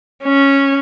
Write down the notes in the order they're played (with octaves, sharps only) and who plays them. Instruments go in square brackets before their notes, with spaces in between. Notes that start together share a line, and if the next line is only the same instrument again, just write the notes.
[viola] C#4